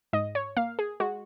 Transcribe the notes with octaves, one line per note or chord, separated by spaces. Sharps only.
G#2 D#5
C#5
A#3 F5
G#4
G#3 F#4